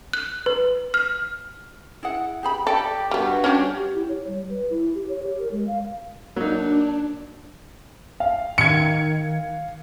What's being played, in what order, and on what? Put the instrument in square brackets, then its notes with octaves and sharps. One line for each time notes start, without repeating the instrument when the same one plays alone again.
[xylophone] F#6
B4
F6
[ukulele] E4 G#4 F#5
G4 G#4 B5
[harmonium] G4 [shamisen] A4 [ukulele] D5 G5
[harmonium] G2 F#4 [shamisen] G3 B3
[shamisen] C#4 D4 [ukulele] G4 C#5
[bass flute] G4
E4
C#5
G3
B4
E4
G4
C#5
G4
A#4
G#3
F5
[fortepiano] F#3 D#4 [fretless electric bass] A#3 [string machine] D4
[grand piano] F5
[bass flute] D#3 [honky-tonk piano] G#6 C#7